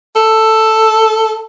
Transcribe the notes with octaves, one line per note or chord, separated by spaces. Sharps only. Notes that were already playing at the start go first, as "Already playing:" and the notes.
A4